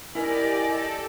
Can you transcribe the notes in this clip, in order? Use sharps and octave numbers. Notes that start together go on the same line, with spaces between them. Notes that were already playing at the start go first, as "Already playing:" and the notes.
E4 G4 A#4 D5 D#5 G#5
A4